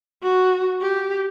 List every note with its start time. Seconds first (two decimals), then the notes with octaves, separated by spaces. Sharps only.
0.23 F#4
0.81 G4